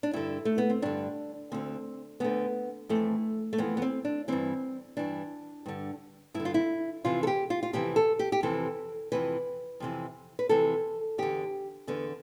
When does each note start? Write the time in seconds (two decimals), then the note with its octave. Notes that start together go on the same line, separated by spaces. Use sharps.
0.03 D4
0.13 G2 D3 E4
0.45 A3
0.58 B3
0.70 C4
0.82 G2 D3 D4
1.52 D2 D3 C4
2.20 D2 D3 B3
2.89 F2 E3 A3
3.53 A3
3.58 F2 E3 B3
3.77 B3
3.82 C4
4.05 D4
4.28 G2 E3 C4
4.97 G2 E3 D4
5.66 G2 D3
6.34 G2 E4
6.40 D3
6.45 F4
6.54 E4
7.04 F2 C3 E3 F4
7.23 A4
7.27 G4
7.50 F4
7.63 F4
7.73 F2 C3 E3 G4
7.96 A4
8.19 G4
8.32 G4
8.43 F2 C3 E3 A4
9.12 F2 C3 E3 B4
9.80 F2 C3 E3
10.39 B4
10.49 F2 C3 E3 A4
11.18 E2 D3 G4
11.87 E2 D3 B3